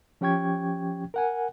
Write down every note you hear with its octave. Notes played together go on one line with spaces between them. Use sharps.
F3 C#4 G4 G5 C#6 G#6
A#4 F#5 G#5